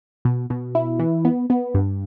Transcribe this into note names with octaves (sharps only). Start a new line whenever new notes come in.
B2
B2
E4
E3
B3
B3
G2